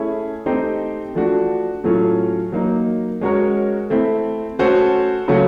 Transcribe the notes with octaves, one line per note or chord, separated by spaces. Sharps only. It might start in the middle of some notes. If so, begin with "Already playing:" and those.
Already playing: A3 C#4 E4 G#4
A3 C4 D#4 G4 C5
F3 A3 D4 F#4
A2 F#3 A3 C#4 F4
F#3 A#3 D#4
G#3 C#4 F#4 A#4 C#5
A3 C4 E4
A3 C#4 F#4 A4 C5
C#3 F#3 A3 C#4 F#4